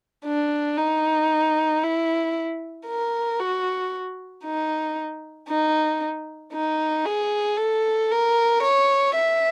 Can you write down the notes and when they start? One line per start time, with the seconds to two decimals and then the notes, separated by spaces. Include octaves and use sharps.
0.25 D4
0.78 D#4
1.83 E4
2.87 A#4
3.40 F#4
4.44 D#4
5.49 D#4
6.53 D#4
7.05 G#4
7.57 A4
8.11 A#4
8.63 C#5
9.15 E5